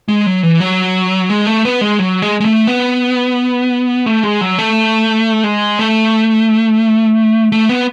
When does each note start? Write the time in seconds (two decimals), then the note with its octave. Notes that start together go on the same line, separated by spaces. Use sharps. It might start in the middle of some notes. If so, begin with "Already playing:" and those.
0.08 G#3
0.26 F#3
0.43 E3
0.60 F#3
1.30 G#3
1.47 A3
1.65 B3
1.81 G#3
1.99 F#3
2.22 G#3
2.40 G#3
2.45 A3
2.67 B3
4.06 A3
4.23 G#3
4.41 F#3
4.59 A3
5.44 G#3
5.79 A3
7.52 A3
7.69 B3